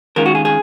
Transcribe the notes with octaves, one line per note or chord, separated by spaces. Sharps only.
D#3 G#3 C#4 F4 A#4
F#4
G#4
G#4